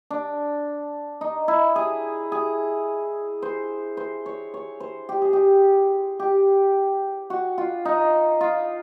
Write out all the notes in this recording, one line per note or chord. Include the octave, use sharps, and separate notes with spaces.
D4
D#4
E4
G#4
G#4
C5
C5
C#5
C#5
C5
G4
G#4
G4
G4
F#4
F4
D#4
F4